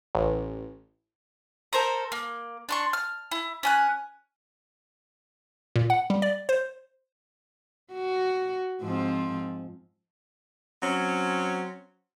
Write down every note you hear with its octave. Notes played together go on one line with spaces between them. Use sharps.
A1
A4 A#4 C5 A#5
A#3
D4 C6 C#6
F6
E4
C#4 G#5 F#6
A#2
F#5
G3
D5
C5
F#4
G#2 F3 C4
F#3 C4 C#4